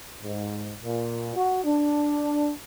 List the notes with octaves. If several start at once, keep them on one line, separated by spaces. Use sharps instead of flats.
G#2
A#2
F#4
D4